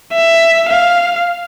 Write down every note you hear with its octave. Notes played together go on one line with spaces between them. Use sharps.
E5
F5